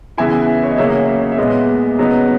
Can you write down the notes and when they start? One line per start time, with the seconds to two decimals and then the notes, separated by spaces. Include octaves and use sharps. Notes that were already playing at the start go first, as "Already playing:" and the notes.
0.17 C#3 E3 B3 E4 E5 G#5
0.64 C#5
0.71 D#5
0.78 C#3 F#3 A#3 C#5 E5
1.19 C#5
1.32 E5
1.38 A#2 G#3 B3 D#5
1.99 C#3 F#3 B3 D#4